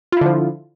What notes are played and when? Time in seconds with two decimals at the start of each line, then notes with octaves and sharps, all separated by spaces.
0.12 F4
0.17 E4
0.21 D3
0.26 F3